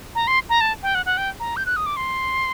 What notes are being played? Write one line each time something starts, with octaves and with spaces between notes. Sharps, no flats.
A#5
C6
A#5
A5
G5
F#5
F#5
G5
A#5
G6
F#6
D#6
D6
C6